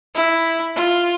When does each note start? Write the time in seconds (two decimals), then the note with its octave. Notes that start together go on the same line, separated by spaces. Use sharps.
0.15 E4
0.76 F4